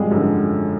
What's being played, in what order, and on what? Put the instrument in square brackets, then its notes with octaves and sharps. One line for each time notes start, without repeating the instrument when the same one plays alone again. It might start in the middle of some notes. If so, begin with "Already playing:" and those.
Already playing: [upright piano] G#1 [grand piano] F3 G3 G#3 F4 G4 G#4
[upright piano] F#2 D3